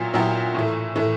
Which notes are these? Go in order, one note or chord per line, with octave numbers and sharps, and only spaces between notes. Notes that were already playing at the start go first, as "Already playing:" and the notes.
Already playing: A#2 F#3 B3 E4 G4
A#2 F#3 B3 E4 G4
A2 E3 A3
A2 E3 A3